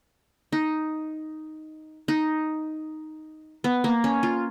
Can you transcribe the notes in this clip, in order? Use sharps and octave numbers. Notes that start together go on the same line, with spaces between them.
D#4
D#4
B3
A#3
C#4
F4